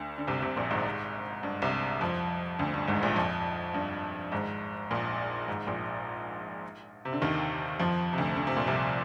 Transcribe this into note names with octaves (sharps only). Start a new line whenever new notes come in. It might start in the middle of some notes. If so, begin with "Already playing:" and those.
Already playing: D2 D3
D3
C2 C3
C2 C3
A#1 A#2
G#1 G#2
G2
C2 C3
F2 F3
D2 D3
G2
G#1 G#2
A#1 A#2
F2
G2
G#1 G#2
A#1 A#2
G#1 G#2
A#1 A#2
C3
D3
D#2 D#3
F2 F3
C3
D2 D3
D3
C3
A#2
C2 C3